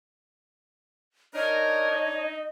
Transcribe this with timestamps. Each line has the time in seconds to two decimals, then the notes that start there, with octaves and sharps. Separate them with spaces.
1.34 D4 D#4 A#4 C#5 D#5
1.92 D#4